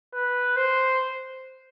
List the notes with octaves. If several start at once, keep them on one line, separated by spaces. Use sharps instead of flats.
B4
C5